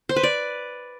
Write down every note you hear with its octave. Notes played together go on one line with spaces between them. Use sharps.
C5
B4
D5